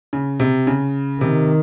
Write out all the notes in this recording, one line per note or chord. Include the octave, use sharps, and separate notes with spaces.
C#3
C3
C#3
C3 D#3